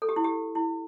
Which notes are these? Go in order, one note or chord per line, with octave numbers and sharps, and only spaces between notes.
A4
G4
E4
G4
E4